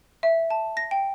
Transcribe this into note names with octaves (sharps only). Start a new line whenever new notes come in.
E5
A5
A#6
G5